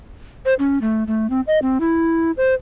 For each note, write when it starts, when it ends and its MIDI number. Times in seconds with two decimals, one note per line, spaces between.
0.45 0.54 72
0.59 0.78 61
0.81 1.04 57
1.07 1.30 57
1.30 1.41 60
1.47 1.59 75
1.62 1.78 60
1.80 2.31 64
2.37 2.54 72